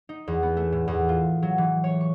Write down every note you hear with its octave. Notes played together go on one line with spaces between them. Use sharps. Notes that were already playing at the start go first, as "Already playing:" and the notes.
D#4
E2
B3
A3
A2
E2
F4
F#3
E3
C#5
C#6